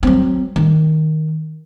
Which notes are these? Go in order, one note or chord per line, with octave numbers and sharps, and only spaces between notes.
F#3 C4
D#3